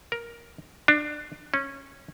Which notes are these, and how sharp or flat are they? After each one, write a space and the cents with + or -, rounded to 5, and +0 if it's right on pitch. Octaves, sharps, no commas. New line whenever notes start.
A#4 +10
D4 +20
C#4 -15